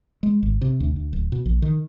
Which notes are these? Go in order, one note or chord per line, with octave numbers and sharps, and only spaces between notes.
G#3
G#1
C3
D2
D2
D1
B2
A#1
D#3